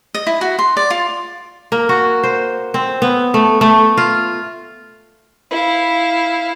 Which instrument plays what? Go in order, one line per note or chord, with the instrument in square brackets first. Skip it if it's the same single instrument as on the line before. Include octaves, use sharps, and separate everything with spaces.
[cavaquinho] D#5
E4
F#4
C6
D5
F4
[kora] A#3
F#4
C5
C4
B3
A3
A3
F4
[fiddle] E4 F5